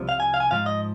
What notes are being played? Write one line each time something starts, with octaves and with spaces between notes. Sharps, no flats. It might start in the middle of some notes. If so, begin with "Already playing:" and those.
Already playing: C2 C3 F3
F5
G#5
F5
G#5
G#2 F3 F5
D#5